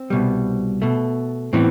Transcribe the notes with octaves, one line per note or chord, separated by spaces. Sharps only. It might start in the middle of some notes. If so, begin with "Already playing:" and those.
Already playing: C4
C2 B2 G3
B2 A3
A2 E3 B3 C4